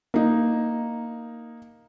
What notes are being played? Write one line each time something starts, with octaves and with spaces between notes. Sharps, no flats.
A#3 D#4